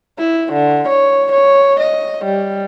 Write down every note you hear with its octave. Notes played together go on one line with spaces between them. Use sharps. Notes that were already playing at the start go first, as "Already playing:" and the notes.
E4
D3
C#5
C#5
D#5
G3